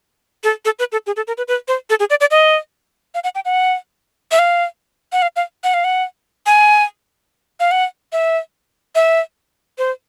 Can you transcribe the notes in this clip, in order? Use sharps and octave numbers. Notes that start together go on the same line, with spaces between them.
A4
A4
B4
A4
G#4
A4
A#4
B4
B4
C5
A4
G#4
D5
D5
D#5
F5
F#5
G5
F#5
E5
F5
F#5
F5
F5
F#5
F5
F#5
G#5
F5
F#5
E5
E5
C5